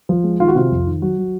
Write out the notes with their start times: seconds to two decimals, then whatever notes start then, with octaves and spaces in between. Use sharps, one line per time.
0.09 F3
0.24 G#3
0.40 D#3 F4
0.48 F#4
0.55 C3 F4
0.71 F2
0.87 D#3
1.02 F#3 F#4
1.18 F#3